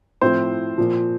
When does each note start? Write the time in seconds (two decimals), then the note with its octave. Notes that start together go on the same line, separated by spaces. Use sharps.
0.21 A2 F3 C4 C5
0.78 A#2 F3